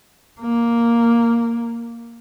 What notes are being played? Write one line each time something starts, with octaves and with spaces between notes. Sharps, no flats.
A#3